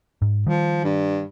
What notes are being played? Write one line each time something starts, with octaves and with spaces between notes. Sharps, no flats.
G#2
D#3 F3 G3
G2